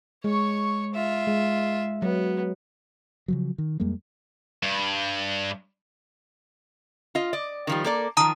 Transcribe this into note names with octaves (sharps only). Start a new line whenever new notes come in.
G#3 C#5 C#6
F4 E5
G#3
F#3 B3
C#3 F3 F#3
D#3
F2 G3 G#3 A#3
G2
F4 D#5
D5 D#5
D#3 F3 G3
A#3 A4 D5
D#3 F3 A5 A#5 D#6